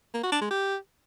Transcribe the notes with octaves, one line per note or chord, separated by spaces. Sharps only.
A#3
F#4
D4
G#3
G4